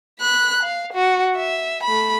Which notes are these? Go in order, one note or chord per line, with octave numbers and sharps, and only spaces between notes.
B5 F#6
F5
F#4
E5
A3 B5